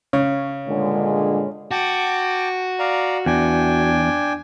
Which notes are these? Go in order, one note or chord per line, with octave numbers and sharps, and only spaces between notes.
C#3 C#5
G2 A#2 D3 G#3
F#4 G5 A5 D6
D5 F5 A#5
E2 D4 G5 G#5